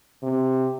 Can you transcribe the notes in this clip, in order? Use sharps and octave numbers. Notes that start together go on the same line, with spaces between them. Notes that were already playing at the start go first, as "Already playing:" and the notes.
C3